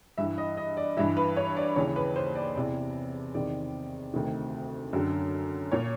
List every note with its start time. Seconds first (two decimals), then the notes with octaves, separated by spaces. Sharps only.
0.18 G2 E3 E5
0.38 D#5
0.57 D#5
0.77 D5
0.97 G2 E3 E5
1.17 B4
1.37 C#5
1.57 D5
1.76 D#2 C#3 E3 C#5
1.96 B4
2.16 C5
2.35 D5
2.55 E2 C3 E3 D5
3.34 E2 C3 D#3 D5
4.14 D2 C3 D#3
4.93 F#2 D3
5.72 A#2 C#5